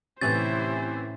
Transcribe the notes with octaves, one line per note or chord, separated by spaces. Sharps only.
A2 C3 E3 A3 C#4 E4 C5 A6